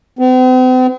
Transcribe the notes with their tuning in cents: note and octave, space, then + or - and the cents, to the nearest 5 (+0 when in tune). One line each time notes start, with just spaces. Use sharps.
C4 -45